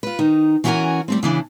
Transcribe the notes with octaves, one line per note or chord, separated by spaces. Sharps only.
F4 B4
D#3 D#4
E3 C#4 E4 F#4 A#4 G#5
G3 A3 C4
C#3 E3 D4 E4